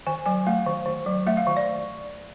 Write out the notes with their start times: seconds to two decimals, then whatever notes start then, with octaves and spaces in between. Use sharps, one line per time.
0.07 D#3 G#5
0.26 F#3 G#5
0.47 A3 F5
0.66 D#3
0.86 D#3
1.06 F#3
1.27 A3 E5
1.37 F5
1.47 D#3
1.57 D5